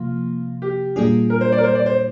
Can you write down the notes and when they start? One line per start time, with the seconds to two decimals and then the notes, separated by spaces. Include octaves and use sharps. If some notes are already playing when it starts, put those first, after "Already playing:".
Already playing: C3 F3 A#3 F4
0.62 G4
0.96 A#2 G3 A#3 D4 F4 G#4
1.30 A#4
1.41 C5
1.52 D5
1.58 A#4
1.64 C5
1.75 D5
1.86 C5